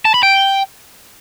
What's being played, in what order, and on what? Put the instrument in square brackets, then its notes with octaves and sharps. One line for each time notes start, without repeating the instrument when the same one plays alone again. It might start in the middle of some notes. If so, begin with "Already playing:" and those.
[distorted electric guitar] A5
B5
G5